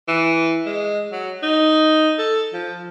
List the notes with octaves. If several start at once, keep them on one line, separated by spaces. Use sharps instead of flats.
E3
G#3
F#3
D#4
A4
F3